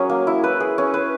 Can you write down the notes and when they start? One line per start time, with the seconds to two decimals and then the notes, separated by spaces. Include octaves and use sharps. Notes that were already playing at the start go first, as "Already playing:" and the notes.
Already playing: F#3 C#4 G#4 A#4
0.10 A#3
0.27 E4
0.44 B4
0.60 G#4
0.78 C#4
0.94 B4